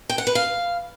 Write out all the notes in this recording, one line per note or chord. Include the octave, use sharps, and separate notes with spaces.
G5
F#5
B4
F5